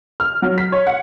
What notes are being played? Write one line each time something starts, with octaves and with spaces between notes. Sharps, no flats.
F6
F#3
B6
C#5
F#5